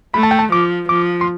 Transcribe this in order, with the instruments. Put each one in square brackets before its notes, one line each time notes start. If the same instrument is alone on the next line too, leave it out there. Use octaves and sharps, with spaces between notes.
[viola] A3 [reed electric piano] B5
[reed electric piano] A5
G5
A5
[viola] F3 [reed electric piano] D6
[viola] F3 [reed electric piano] D6
[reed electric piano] C6